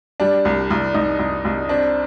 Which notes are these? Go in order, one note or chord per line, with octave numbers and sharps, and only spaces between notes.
G3 D4
C2
C2
C2 D#4
C2
C2
C4 D4